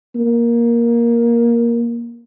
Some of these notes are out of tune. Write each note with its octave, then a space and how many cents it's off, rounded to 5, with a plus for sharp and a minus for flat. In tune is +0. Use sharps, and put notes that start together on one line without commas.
A#3 +10